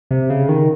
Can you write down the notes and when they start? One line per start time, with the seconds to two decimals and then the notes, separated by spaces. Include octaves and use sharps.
0.11 C3
0.30 C#3
0.49 D#3